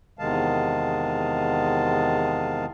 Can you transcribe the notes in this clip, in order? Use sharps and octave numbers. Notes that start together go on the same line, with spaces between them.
E2 C3 D#3 G#3 F5 A5